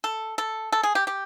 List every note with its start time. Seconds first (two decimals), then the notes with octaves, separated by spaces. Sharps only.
0.04 A4
0.38 A4
0.72 A4
0.83 G#4
0.95 G4
1.07 G4